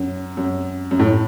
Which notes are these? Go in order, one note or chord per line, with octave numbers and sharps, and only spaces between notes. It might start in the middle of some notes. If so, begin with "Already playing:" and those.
Already playing: F#2
F#2
F#2
A2